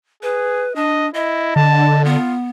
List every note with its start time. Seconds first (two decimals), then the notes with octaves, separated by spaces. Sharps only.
0.23 G#4 B4
0.76 D4 D#5
1.14 E4 D#5
1.56 D3 A5
2.05 B3 F4